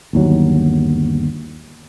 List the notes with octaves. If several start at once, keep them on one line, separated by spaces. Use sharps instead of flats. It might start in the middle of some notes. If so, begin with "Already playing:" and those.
G1 D#2 F#3